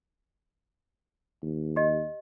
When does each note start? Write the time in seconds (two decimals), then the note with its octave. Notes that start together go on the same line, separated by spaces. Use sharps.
1.42 D#2
1.76 G4 D#5